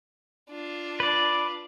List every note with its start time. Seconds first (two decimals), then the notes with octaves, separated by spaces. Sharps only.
0.50 D4 F4
1.00 B4 D5